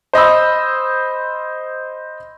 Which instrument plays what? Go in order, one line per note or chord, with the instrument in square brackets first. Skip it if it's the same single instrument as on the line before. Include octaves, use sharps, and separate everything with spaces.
[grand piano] C5 D#5 B5 E6